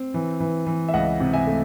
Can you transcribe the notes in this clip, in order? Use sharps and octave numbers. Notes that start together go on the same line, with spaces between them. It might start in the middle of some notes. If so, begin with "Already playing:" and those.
Already playing: C4
E3
E3
E3
E5
C#2 D#5 F#5
C3
E5 G#5
A3